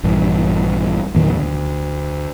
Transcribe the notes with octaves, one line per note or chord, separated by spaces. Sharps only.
A#1 G2 E3
E2 A#2 D#3 F#3
D2